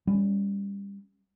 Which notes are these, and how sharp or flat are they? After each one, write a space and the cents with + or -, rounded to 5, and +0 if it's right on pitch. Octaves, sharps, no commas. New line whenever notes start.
G3 +25 C#4 +0